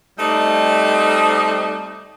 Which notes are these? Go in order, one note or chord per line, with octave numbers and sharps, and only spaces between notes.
G3 A3 C4 D#4 D5 D#5